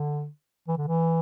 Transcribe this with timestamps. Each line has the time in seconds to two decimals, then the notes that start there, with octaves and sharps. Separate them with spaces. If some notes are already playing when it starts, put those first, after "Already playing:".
Already playing: D3
0.68 E3
0.77 D3
0.87 E3